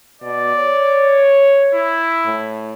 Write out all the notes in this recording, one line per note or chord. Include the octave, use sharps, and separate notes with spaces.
B2 D5
C#5
E4
A2